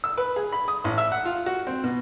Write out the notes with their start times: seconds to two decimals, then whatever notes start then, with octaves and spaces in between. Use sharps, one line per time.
0.04 E6
0.17 B4
0.36 G#4
0.53 B5
0.68 D#6
0.84 A1
0.98 E5
1.12 F#5
1.25 F4
1.46 F#4
1.67 C4
1.84 B2